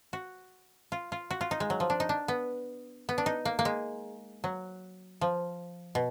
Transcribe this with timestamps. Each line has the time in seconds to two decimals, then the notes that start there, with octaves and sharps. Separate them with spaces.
0.13 F#4
0.92 F4
1.12 F4
1.31 F#4
1.41 F4
1.51 D#4
1.60 G#3
1.70 F#3
1.80 F3
1.90 D4
2.00 D#4
2.09 D4
2.28 B3
3.09 B3
3.18 D4
3.26 D#4
3.45 A#3
3.59 A#3
3.65 G#3
4.44 F#3
5.21 F3
5.95 B2